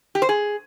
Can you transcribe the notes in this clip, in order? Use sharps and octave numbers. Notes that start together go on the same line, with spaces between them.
G4
C5
G#4